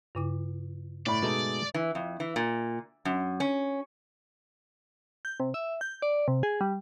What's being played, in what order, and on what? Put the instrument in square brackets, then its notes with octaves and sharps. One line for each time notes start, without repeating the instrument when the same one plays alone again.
[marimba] G2 C#3 E4
[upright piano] A2 B5 [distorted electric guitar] D5
[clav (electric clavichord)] B2 A3 D#4 [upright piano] G#3
[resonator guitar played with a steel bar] E3
F2
E3
A#2
F#2
C#4
[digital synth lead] G6
C3
E5
G6
D5
C3
G#4
G3